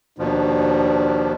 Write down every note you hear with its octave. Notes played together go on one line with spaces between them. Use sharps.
D#2 B2 F3 D4